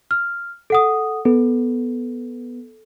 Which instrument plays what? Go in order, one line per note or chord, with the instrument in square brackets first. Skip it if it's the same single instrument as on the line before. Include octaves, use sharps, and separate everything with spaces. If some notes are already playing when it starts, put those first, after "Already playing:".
[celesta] F6
A4 F#5 D#6
[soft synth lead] B3 [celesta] A4